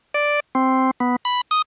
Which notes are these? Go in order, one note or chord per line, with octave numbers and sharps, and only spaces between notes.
D5
C4
B3
B5
D#6